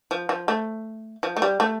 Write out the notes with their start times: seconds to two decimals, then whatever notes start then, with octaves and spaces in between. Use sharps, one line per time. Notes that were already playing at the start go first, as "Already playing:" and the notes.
0.11 F3
0.29 F3
0.48 A3
1.23 F3
1.37 A3
1.42 G3
1.60 A3